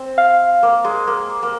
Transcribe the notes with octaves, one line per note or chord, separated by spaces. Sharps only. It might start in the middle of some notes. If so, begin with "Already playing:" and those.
Already playing: C4
F5
A#3
G#3
A#3
A#3